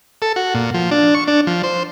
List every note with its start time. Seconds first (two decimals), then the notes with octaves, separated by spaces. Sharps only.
0.22 A4
0.36 F#4
0.55 A#2
0.74 F3
0.91 D4
1.15 C#6
1.28 D4
1.47 F3
1.63 C5